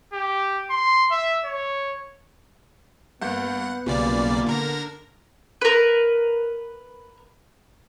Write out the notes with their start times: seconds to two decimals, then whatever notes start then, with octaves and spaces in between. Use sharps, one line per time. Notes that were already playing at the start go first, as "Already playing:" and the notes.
0.14 G4
0.70 C6
1.11 E5
1.45 C#5
3.22 G2 A#3 B3 F#5 G6
3.86 B1 A#2 C#3 G3 A#3 D5
4.47 D3 A#4 A#6
5.61 A#4 B4